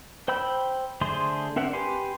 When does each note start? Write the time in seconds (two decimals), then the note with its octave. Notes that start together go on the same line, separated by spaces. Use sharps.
0.28 C5 G5 B5 E6 G6
1.01 D3 A3 G#4 C5 C6
1.56 C4 D4 A#4 E5 F#5
1.73 G4 B4 G#5 C6